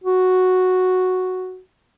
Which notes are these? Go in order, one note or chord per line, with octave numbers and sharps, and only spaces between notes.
F#4